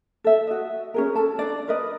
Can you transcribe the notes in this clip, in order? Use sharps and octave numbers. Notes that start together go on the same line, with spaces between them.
A4 E5
F#4 D#5
C#4 G#4 A#4
A4 A5
D4 D5
A#4 B4 D#5